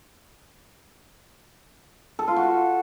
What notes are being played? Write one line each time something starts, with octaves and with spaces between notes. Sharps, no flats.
A4
F4
F#4